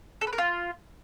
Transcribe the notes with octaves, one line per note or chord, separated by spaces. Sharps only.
A4
B4
A#4
F4